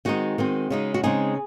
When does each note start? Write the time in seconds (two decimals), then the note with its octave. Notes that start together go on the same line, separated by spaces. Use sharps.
0.05 D#3 G#3 C4 D#4 F#4
0.38 D#3 G#3 C4
0.70 C#3 G#3 D#4
0.94 F#4
1.03 C#3 G#3 C4 D#4 G#4